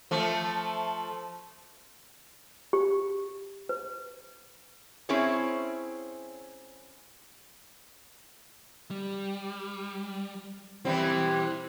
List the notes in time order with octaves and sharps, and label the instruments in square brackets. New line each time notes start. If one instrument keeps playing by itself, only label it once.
[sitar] F3 A3
[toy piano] G4
B4
[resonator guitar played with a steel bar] C4 C#4 E4 G#4 C5 C#5
[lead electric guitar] G3
[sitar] E3 G3 C4 [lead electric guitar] E4 G5